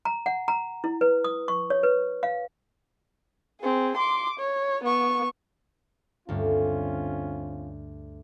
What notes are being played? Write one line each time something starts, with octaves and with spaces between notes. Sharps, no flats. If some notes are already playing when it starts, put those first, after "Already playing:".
A#5
F#5
A#5
E4
B4
D#6
C#6
C#5
B4
F5
C4 G#4
C6 D6
C#5
B3 C#6
D2 G2 C4 C#4 F4 A4 F5